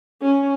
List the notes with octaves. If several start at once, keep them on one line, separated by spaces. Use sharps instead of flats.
C#4